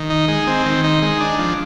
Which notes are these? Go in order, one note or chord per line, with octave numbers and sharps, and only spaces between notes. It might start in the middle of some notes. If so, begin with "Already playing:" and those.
Already playing: D#3
D#4
G#3
C4
D#3
D#4
G#3
D4
F3